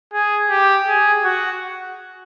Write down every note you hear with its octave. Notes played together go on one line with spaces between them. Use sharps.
G#4
G4
G#4
F#4